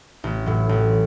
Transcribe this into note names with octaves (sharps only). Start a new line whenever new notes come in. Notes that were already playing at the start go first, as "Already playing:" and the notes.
A1
A2 F#3
A1